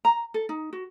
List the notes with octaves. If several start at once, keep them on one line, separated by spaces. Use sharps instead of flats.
A#5
A4
D#4
F#4